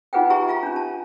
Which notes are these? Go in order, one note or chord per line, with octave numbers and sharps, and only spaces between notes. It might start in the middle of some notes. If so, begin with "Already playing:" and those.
D#4 F4 G#4 B4 F#5 G5
G4 G#4 E5 G#5 A#5 C#6
F4 F5 A#5
C#4 D4
A5